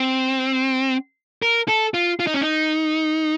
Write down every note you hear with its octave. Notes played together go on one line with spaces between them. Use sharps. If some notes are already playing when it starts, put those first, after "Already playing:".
Already playing: C4
A#4
A4
F4
F4
D#4
C#4
D#4